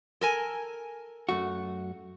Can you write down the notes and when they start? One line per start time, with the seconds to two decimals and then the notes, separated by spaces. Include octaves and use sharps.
0.21 A4 A#4 G#5
1.29 F#2 A3 F#4